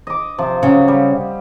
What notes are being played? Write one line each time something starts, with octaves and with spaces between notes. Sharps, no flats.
D#5 D6
C3 F3
C#3 F#3
G3